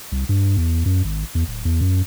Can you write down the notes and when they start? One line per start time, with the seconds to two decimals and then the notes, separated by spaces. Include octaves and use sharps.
0.12 C2
0.29 G2
0.57 E2
0.86 F#2
1.04 G#1
1.35 E2
1.48 D1
1.65 E2
1.81 F#2